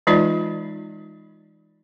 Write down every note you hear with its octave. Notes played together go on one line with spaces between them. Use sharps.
E3 G#3 D#4 F4 D5 D#5